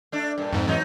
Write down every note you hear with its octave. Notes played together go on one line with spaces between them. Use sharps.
A3 D4
G2 A#2
F2 G#2
E3 F#3 D#4